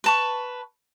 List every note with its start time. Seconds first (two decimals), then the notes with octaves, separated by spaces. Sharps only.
0.04 B4 A5 C#6